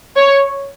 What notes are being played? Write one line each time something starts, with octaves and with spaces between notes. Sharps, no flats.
C#5